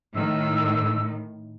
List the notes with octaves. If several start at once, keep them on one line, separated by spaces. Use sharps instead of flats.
A2 D#3 E6